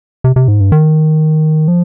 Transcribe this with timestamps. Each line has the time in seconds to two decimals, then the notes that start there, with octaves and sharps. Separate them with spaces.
0.24 C3
0.36 C3
0.48 G#2
0.60 G2
0.72 D#3
1.68 F3